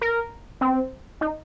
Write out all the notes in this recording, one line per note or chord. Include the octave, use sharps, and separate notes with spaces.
A#4
C4
D#4